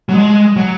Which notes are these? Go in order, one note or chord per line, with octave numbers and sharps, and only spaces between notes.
F#3
G#3
F#3